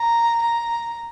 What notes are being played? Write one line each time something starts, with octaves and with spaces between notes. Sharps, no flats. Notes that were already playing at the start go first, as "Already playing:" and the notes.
Already playing: A#5
A#5